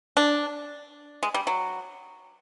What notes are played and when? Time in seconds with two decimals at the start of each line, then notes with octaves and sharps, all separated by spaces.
0.17 D4
1.23 G#3
1.34 G3
1.47 F#3